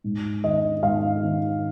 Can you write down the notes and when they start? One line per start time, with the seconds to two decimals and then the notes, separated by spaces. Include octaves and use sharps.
0.04 G#2
0.43 D#3 D#5
0.82 G#2 F5
1.23 D#3